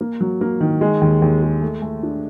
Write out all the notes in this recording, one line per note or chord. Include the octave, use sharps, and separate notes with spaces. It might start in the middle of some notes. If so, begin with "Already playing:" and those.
A#3
F#3
A#3
D#3
G#3
D#2
D#2
G#3
A3
A3
D4